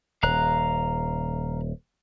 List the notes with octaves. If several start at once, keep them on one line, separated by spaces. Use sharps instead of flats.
D#1 F5 A#5 F#6